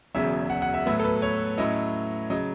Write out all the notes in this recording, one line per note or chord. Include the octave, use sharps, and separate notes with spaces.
E1 E2 C#3 F#3 E5
F#5
F#5
E5
A2 F#3 B3 E5
A4
B4
C#5
A2 F#3 C#4 E4 D#5
C#3 F#3 D#5